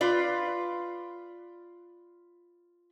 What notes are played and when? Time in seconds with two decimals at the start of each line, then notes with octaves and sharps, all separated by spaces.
0.01 F4 B4 D5